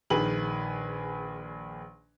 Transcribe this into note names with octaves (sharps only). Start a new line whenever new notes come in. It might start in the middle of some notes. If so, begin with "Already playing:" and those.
A#1 D#3 G#4 B4 F#7